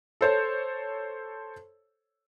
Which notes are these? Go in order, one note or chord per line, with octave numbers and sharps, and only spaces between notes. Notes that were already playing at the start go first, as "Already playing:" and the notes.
A4 C5 C#5